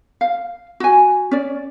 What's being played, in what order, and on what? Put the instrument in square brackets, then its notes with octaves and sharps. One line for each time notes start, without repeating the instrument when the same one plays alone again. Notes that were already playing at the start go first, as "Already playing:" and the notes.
[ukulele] F5
F#4 G#5
C#4 D5